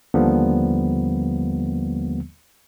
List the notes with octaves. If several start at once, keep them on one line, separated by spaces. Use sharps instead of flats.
D#2 D3 F3 G3 A#3 B3